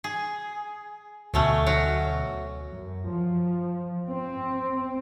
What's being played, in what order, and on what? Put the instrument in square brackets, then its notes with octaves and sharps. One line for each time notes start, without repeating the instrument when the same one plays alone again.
[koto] G#4
[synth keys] D2 B2 [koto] F#3 A3 C#4
[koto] F#3 F#4
[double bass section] F#2
F3
C4